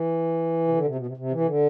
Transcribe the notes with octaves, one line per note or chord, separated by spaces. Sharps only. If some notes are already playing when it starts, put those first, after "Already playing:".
Already playing: E3
C3
D3
C3
B2
C3
C3
E3
C3
D3